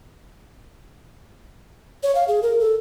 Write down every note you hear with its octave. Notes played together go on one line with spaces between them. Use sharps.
C#5
F5
G#4
A#4
A4